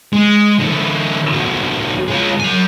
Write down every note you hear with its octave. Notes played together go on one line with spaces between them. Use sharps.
G#3
D3 E3
C2 F#3
G#3 F4
F#3 G#5